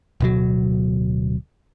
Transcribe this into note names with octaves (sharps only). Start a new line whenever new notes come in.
D1 B2 F#3